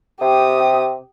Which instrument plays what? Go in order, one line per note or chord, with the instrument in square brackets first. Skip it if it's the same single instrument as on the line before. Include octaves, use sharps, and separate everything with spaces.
[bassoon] C3 [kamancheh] G4 D#6